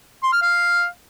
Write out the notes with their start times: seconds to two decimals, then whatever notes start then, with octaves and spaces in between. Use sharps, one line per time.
0.23 C6
0.33 F6
0.42 F5